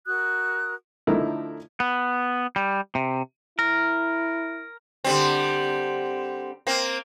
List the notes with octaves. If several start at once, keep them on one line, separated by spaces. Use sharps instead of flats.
F#4 A#4 D#6 F#6
D3 F3 A3 D#4 E4 A#4
B3
G3
C3
E4 A#4
D3 G3 C4
A#3 C4